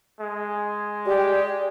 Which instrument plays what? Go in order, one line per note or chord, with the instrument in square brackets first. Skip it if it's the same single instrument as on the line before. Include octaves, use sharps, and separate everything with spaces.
[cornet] G#3
[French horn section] G4 [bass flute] D5